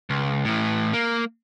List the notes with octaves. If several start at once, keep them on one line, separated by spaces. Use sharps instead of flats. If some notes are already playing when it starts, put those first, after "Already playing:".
C#2
A2 E3
A#3